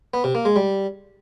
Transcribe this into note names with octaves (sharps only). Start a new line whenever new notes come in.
B3
C3
A#3
G#3
G3